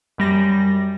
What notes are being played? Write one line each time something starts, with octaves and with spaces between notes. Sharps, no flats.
F#2 G3 A#6